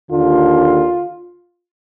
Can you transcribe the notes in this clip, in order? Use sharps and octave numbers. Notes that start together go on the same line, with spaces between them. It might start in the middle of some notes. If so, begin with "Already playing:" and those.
D#2 D3 F4